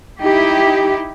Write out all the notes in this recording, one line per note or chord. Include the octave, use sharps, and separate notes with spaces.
D#4 E4 G4